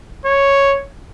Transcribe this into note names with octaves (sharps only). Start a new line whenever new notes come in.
C#5